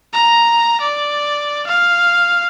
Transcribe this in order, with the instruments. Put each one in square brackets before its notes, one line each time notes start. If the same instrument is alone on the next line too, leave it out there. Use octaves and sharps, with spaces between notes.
[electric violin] A#5
D5
F5